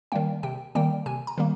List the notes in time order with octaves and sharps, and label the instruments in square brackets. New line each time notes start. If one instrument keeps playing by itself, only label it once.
[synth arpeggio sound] D#3 G3 A#3 G5
C3 G5
D#3 G3 A#3 G5
C3 G#5
A#5
D#3 G3 A#3